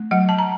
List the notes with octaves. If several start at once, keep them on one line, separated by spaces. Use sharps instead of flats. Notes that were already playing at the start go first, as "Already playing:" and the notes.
Already playing: A3
F#3 F#5
A5
A#5